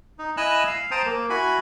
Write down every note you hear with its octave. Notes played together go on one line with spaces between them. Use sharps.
D#4
E4 D#5 G#5 E6 F#6
F5
C5 G5 A5 A#5 D#6
A#3
E4 F#4 G#5 B5